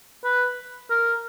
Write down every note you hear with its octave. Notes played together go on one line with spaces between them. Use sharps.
B4
A#4